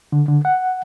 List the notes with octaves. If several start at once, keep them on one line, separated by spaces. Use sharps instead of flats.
D3
D3
F#5